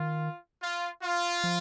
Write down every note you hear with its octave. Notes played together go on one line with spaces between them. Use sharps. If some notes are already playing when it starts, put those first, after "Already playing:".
Already playing: D#3 F4
F4
F4
F3